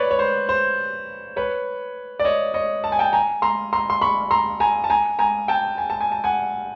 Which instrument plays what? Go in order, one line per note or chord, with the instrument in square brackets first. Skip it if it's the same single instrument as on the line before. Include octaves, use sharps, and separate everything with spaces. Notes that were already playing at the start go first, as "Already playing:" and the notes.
Already playing: [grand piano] B4 C#5 D5
C#5
C5
C5
B4 C#5
D5
C#5 D#5
C#5 D#5
A5
G#5
G5 A5
G#5 A#5
A#5 C6
A#5 C6
C6
B5 C#6
A#5 C6
G#5 A#5
A5
G#5 A#5
G#5 A#5
G5 A5
G#5
A5
G#5
A5
F#5 G#5